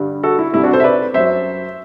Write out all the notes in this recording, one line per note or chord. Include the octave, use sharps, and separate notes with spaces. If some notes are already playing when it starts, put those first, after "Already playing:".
Already playing: G2 D3 G3
F#4 A4
E4
C2 C3 G3 E4
D4 F#4
A4 C5
E5
B4 D5
F#2 F#3 C5 E5